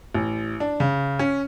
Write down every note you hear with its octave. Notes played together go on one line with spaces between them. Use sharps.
A1
D4
C#3
C#4